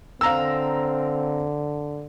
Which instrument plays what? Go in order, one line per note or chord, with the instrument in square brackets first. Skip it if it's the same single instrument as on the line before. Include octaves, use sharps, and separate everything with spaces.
[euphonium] D3 [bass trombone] C4 [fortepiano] F5 A#5 E6